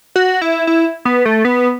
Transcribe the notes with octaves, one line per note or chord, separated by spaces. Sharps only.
F#4
E4
E4
B3
A3
B3